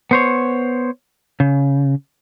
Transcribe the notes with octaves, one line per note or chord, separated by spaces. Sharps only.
B3 C5 C#5
C#3